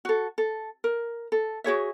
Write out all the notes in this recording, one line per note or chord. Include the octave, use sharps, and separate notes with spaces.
F#4 A4
A4
A#4
A4
F#4 G#4 C#5 E5